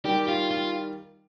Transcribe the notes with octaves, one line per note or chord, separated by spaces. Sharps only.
D#3 G3 G4
F4
F4